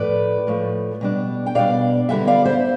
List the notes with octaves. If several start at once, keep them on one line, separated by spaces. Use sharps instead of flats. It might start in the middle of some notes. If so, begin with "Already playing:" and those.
Already playing: A2 F3 A3 B4 D5
A2 F3 A3
B2 G3 D4
G5
B2 G3 D4 D5 F5
D3 G3 B3 E4 E5 G5
D5 F5
C5 E5